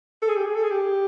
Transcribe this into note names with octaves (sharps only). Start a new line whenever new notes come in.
A4
G#4
G4
G#4
A4
G#4
G4